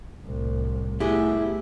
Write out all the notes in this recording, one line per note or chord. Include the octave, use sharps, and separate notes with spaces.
C2 A2
A3 B3 E4 G4 G#4